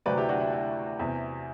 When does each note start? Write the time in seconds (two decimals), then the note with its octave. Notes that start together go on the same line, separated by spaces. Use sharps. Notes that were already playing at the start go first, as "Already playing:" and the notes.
0.06 D2 C3 F#3 A3 C4 B4 D5
0.18 E4 G4
0.29 D4 F#4
0.41 E4
0.53 E4
0.99 E2 C3 E3